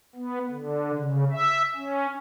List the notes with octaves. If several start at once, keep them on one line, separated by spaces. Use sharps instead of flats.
B3
D3
C#3
E5
C#4